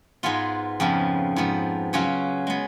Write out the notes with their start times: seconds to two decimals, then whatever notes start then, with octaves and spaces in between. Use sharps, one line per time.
0.23 G#2 G#3 B3 F4
0.80 F2 C#3 F3 B3
1.36 G#2 F3 B3
1.93 C#3 F#3 C#4 F4
2.47 G#3 B3